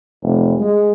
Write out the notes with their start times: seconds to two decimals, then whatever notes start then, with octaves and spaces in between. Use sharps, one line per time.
0.22 F1
0.60 G#3